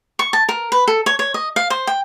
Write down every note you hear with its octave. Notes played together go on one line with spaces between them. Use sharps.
C#6
A5
A#4
B4
A4
C#5
C#5
D#5
F5
C5
G5